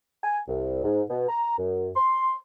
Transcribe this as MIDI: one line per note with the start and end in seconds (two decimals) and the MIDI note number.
0.24 0.39 80
0.48 0.81 36
0.84 1.02 44
1.10 1.29 47
1.29 1.56 82
1.58 1.89 42
1.96 2.36 84